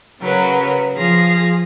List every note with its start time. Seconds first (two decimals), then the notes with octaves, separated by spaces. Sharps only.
0.19 C#3 F#3 A#4 B4
0.95 F3 G#4 F5 A#6